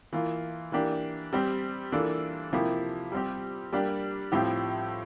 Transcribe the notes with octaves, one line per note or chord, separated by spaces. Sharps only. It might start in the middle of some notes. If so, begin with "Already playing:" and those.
E3 A#3 F4
E3 A#3 D4 G4
G3 C4 G4
E3 A#3 D4 F4 A4
C3 F3 A#3 E4 G4
G3 C4 G4
G3 A#3 D4 G4
A2 F3 C4 E4 G4